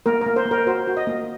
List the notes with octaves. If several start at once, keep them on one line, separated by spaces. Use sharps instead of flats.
A#3 A#4
A#3 A#4
C5
A#3
A#4
F#4 C5
F#4
D#5
A#3